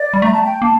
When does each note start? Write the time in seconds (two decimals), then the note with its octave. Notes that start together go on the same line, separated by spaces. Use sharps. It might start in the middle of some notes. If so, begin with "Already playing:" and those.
Already playing: D5
0.14 G3
0.22 A3 A#5
0.32 A5
0.43 G5
0.62 A#3 A5